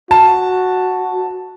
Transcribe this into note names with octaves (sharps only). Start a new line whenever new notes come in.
F#4 A5